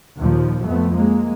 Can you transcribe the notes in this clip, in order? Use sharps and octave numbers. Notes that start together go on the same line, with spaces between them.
D#2 A#2 F3
F2 F3 A3 B3
G#3 A#3